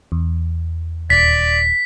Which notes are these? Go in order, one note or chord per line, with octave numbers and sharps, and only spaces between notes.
E2
D#1 D5 B6